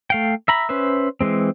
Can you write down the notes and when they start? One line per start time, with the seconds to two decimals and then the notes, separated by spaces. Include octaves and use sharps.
0.10 A3 F5 G5
0.48 E5 A#5 B5
0.69 C#4 B4 C5 E5
1.21 E3 G#3 C4